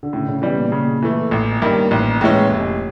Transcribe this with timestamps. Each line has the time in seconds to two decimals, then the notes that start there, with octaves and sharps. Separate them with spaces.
0.03 D3
0.13 A2 C#3
0.28 C#3
0.42 B2 E3 G3
0.57 A#2
0.72 A#2 C#3
1.03 E3 A3
1.31 A1
1.62 G2 D#3
1.91 A1
2.21 A2 E3 G#3 C#4
2.50 F1